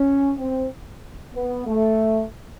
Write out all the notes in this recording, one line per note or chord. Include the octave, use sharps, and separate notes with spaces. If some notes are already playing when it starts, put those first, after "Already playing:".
Already playing: C#4
C4
B3
A3